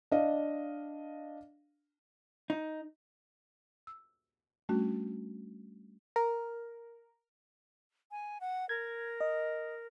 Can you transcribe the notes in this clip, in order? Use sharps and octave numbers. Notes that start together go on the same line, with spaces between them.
D4 D#5 F5
D#4
E6
G3 A3 C#4 D4 F#4
A#4
G#5
F#5
A#4 G#6
D#5